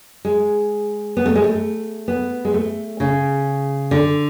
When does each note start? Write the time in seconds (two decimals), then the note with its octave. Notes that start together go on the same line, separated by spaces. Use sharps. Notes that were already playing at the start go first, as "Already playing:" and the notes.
0.25 G#3
1.17 B3
1.26 A3
1.35 G#3
1.44 A3
2.08 B3
2.45 G#3
2.54 A3
3.00 C#3
3.91 D3